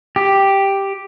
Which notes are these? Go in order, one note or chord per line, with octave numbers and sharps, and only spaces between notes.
G4